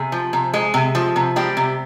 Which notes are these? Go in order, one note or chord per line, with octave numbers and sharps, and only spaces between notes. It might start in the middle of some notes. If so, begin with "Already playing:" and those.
Already playing: C3 G#4
F3
C3
G#3
C3
F3
C3
G3 G#3 G4
C3